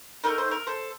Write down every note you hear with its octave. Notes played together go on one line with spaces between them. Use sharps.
A3 C4 D#4 A#4
C5
A#4
A4 C5